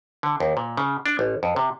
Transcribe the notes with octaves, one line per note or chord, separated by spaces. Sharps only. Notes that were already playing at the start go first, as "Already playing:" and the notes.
D3
D#2
A#2
C#3
D4
A1
F2
C3